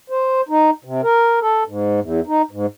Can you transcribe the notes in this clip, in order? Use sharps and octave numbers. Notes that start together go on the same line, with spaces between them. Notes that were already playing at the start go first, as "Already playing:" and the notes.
C5
D#4
C3
A#4
A4
G#2
E2
D#4
G#2